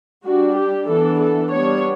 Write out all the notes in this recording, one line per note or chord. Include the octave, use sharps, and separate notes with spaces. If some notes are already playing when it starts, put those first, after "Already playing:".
G3 D4 F#4
G4
E3 B3 D4 A4
A4
G3 B3 D4 C#5